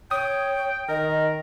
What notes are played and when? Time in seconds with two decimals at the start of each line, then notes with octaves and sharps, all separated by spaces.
0.11 C#5 G5 D#6
0.89 D#3 A#4 D#5